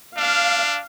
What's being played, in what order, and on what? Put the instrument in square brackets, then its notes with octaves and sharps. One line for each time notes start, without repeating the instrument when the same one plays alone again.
[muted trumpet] D4 [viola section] F5